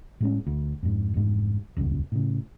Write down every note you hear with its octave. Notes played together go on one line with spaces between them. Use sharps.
A2 G#3 C#4
D2
F2 G#2
F1 G#2
D#1 C#2 F#2
A2 C#3